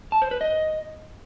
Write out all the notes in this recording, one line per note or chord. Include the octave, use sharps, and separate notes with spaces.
A5
C5
B4
D#5